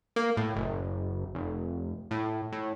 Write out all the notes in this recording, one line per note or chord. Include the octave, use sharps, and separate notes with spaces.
A#3
A2
F#1
F1
A2
A2